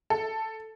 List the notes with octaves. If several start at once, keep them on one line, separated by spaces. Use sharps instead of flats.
A4